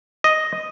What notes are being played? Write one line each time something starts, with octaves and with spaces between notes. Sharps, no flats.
D#5